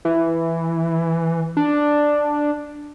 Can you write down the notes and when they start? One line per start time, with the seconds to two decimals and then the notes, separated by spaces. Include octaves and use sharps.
0.05 E3
1.57 D4